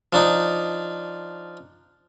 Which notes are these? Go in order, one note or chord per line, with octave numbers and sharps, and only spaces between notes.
F3 D4 D#4